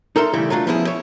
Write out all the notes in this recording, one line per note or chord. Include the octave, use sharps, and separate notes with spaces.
D#4 A4 A#4 E5 C6
C#3 E3 G3 A3 E4
F#3 A3 D4 F4
F3 B3 C#4 E4 F4 G#4
C#5 E5